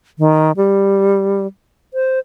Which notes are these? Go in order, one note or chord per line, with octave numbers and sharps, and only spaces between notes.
D#3
G3
C5